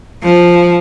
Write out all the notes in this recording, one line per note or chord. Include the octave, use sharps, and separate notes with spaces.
F3